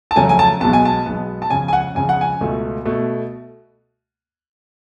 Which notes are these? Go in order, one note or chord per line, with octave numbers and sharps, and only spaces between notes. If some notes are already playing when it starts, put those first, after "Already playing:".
A5
F2 C#3 F#3 A3 G#5
G#5
A5
B1 B2 G#3 B3 A5
G#5
A5
B1 B2 G#3 B3
A5
F2 C#3 G#3 G#5
G#5
F#5
F2 C#3 G#3 G#5
F#5
G#5
C#2 B2 A3
B2 A3